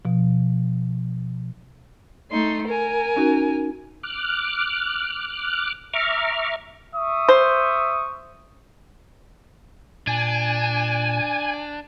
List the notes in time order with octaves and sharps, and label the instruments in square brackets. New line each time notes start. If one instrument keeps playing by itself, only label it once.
[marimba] B2 F3
[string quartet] A3 D#4 C6
A#4 G#5
[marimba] C#4 D#4 F#4
[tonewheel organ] D6 F6 F#6
E5 A#5 C#6 D6 F6
[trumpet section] E5 C#6 D#6
[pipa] C5
[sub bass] A#2 [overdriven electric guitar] D4 [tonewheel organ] G#5